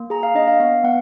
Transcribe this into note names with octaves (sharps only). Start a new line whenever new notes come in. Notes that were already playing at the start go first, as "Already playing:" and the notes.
Already playing: A#3
G#4 A#5
F5
D4 D#5
F5
B3 F5
B3 F#5